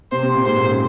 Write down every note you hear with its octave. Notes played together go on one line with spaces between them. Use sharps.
C3 C5
C3
A#2
G#2 C5
A#2
C#3